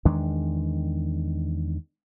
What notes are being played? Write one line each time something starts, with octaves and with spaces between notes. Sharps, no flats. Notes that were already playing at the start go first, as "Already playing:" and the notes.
E2 D#3 G#3 D4